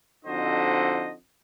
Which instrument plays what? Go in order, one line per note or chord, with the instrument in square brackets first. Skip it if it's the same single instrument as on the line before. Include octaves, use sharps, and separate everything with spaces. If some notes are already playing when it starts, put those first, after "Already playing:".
[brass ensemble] F2 D3 D#4 F#4 C5 D#5